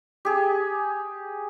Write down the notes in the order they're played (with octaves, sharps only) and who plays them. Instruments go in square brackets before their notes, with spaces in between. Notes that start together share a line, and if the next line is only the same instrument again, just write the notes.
[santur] G4 G#4